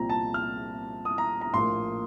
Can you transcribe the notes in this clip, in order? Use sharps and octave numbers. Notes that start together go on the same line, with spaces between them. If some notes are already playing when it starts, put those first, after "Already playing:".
Already playing: C2 A#2 F3 C4 F4 A#5
A5
F6
D#6
A#5
A#5
A#1 A2 F3 A#3 C6